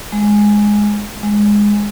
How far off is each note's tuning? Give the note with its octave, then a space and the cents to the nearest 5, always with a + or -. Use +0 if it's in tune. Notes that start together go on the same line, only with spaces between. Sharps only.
G#3 +0
G#3 -5